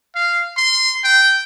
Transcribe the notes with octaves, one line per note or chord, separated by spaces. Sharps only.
F5
C6
G5